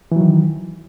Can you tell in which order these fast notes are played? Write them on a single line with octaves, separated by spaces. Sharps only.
E3 F#3 D#3